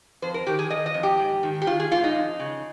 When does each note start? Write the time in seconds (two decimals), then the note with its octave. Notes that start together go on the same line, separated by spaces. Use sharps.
0.22 F2 C5
0.34 A#4
0.47 D#3 G4
0.59 G#4
0.70 D#3 D#5
0.86 D#5
0.94 F2
1.03 G4
1.19 G#2
1.43 D#3
1.62 G4
1.67 D#3 F4
1.80 G#4
1.91 G#2 F4
2.04 D#4
2.15 F2
2.40 C#3